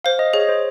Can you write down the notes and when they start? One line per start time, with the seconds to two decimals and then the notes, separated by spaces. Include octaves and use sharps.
0.05 C5 F5
0.19 D#5
0.33 G#4 C#5
0.49 C5